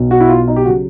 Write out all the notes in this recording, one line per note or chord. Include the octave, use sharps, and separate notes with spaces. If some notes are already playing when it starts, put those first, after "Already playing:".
Already playing: B1 B2 F#3
F#4
E4
F4
D#4
G4
C#3 F#3 F#4